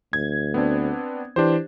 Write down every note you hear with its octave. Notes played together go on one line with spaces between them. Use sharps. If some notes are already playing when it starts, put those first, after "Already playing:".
D2 G#6
B3 C4 D4
E3 D4 G4 C5